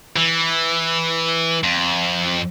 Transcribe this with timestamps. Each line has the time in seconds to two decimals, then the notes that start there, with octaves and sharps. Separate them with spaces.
0.17 E3
1.63 F2